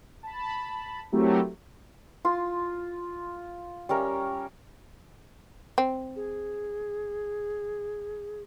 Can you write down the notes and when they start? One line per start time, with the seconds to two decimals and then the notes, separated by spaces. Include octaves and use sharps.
0.23 A5 B5
1.12 F#3 A3 C4 E4 G4 A#4
2.25 F4 C6
3.89 G3 C#4 A#4 E5
5.78 C4
6.16 G#4